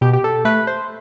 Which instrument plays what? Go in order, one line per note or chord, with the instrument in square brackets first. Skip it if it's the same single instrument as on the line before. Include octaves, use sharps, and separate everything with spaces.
[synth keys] B2 G4
G4
A4
A3 B4
C5